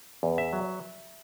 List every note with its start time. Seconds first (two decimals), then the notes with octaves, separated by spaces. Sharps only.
0.23 E2
0.38 E5
0.53 F#3